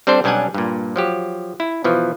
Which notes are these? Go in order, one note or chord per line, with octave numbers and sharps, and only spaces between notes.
G3 C4 D4 A4 C5
B1 G3 C#4 D4 F#5 G#5
G2 A#2
F3 F#3 G4
E4
B2 E3 F3